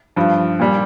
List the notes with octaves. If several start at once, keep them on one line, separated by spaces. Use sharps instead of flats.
G2 F3
A#2 G3